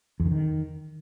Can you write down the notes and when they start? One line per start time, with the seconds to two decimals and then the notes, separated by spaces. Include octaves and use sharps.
0.20 E2
0.26 D3
0.32 D#3